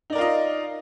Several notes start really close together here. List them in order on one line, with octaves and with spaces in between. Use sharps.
D#4 D5 A#4 F4 D#5